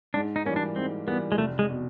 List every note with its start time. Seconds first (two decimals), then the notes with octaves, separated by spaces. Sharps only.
0.14 G#2 D4
0.36 D#4
0.45 E3 G3 A#3 C#4
0.56 D4
0.76 G#2 C4
1.07 E3 G3 A#3 B3
1.32 G#3
1.38 F1 A3
1.59 G#3
1.70 B2